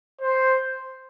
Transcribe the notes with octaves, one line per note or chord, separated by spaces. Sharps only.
C5